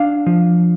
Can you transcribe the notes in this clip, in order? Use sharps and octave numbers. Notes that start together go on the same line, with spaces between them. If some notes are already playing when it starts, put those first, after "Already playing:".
Already playing: D4 F5
F3